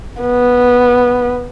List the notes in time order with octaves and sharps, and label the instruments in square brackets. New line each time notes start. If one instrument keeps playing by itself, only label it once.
[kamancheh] B3